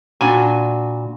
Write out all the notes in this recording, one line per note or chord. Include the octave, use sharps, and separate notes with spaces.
A#2 D4 F#4 B4 G#5